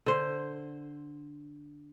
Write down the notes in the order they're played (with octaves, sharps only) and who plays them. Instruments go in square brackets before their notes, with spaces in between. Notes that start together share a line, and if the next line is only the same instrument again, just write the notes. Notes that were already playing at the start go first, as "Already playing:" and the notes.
[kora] D3 C5